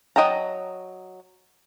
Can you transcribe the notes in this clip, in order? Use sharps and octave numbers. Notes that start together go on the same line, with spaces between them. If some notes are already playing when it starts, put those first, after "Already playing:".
F#3 D#5 G5 A5 A#5